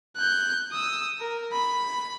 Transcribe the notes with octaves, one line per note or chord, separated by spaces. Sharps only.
F#6 G6
D#6 E6
A#4
B5